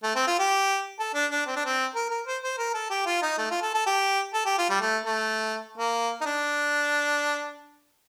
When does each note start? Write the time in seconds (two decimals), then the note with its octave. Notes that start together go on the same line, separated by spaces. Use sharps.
0.03 A3
0.16 C4
0.27 F4
0.39 G4
0.99 A4
1.14 D4
1.31 D4
1.47 C4
1.56 D4
1.65 C4
1.95 A#4
2.10 A#4
2.27 C5
2.43 C5
2.58 A#4
2.74 A4
2.91 G4
3.06 F4
3.22 D#4
3.38 A3
3.51 F4
3.62 A4
3.75 A4
3.87 G4
4.34 A4
4.46 G4
4.58 F4
4.70 G3
4.81 A3
5.05 A3
5.78 A#3
6.21 D#4
6.26 D4